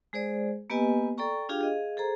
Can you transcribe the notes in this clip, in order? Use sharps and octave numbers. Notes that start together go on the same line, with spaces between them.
G#3 G#4 C5 D5
A#3 B3 G4 B4 D#5 G#5
A4 D5 G5 A#5 C#6
D4 F4 G4 G#4 F5 G5
G#4 D#5 F5
G#4 A4 C5 A#5